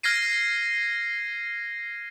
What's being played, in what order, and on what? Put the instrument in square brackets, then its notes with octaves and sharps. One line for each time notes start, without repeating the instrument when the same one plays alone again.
[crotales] F6 G#6 A#6 C7 D#7